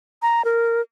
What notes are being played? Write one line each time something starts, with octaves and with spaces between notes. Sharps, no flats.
A#5
A#4